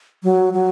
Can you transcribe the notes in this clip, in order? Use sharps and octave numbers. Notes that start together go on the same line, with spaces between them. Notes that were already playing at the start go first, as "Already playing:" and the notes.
F#3
F#3